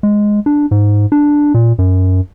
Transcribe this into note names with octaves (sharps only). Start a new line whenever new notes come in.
G#3
D4
G#2
D4
A#2
F#2